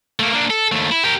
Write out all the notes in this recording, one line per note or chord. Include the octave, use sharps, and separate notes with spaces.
A3 A#3
A#3 D4
A4
D#2 A3
E4
G4 A#4